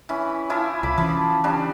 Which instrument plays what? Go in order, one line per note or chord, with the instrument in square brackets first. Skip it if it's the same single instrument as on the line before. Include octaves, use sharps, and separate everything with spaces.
[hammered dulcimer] E3 C#4
F3 E4 F4
[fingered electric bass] C2 [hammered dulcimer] B5 D6
[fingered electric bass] E3 C#4 [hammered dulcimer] F3
[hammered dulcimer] C#3 G3 D4